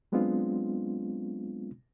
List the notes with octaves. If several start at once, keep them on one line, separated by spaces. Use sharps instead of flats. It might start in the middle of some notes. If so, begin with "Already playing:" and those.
F#3 G#3 B3 C4 D4 F4